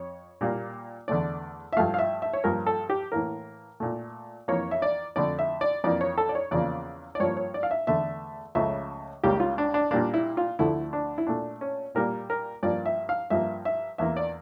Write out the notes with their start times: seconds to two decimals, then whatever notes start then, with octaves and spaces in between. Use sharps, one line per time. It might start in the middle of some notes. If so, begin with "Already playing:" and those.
Already playing: F2 C#5
0.41 A#2 G3 A#3
1.08 E2 D3 A3 D5
1.73 E5
1.77 G2 F3 A3 F5
1.94 F5
1.98 E5
2.22 E5
2.33 C#5
2.44 G2 F3 A#3 A#4
2.67 A4
2.90 G4
3.12 A2 E3 A#3 A#4
3.80 A#2 A3
4.48 F2 E3 A#3 C#5
4.71 E5
4.82 D5
5.16 F2 D3 A3 D5
5.39 E5
5.61 D5
5.84 F2 E3 A#3 D5
6.01 C#5
6.18 A4
6.29 D5
6.35 C#5
6.51 E2 C#3 F3 A#3 D5
7.15 D5
7.20 G2 F3 A#3 C#5
7.37 C#5
7.54 D5
7.63 F5
7.71 E5
7.87 E2 D3 A3 E5
8.55 C#2 C#3 F3 A3 E5
9.23 C#2 C#3 G3 A#3 G4
9.40 F4
9.58 D4
9.74 D4
9.91 A#2 G3 A#3 D4
10.14 E4
10.37 F4
10.59 D2 D3 F3 A3 E4
10.93 D4
11.18 E4
11.27 A#2 A3 D4
11.61 C#4
11.95 A#2 G3 A#3 A#4
12.30 A#4
12.63 G2 F3 A#3 D5
12.86 E5
13.09 F5
13.30 G2 F3 A#3 E5
13.65 E5
13.98 E2 E3 A#3 E5
14.17 D5